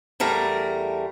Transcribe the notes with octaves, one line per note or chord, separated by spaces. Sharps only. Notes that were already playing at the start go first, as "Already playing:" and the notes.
E2 G3 A3 A#4